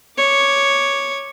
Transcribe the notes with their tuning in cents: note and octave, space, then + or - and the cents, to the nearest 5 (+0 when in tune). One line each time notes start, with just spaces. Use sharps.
C#5 +0 D6 +0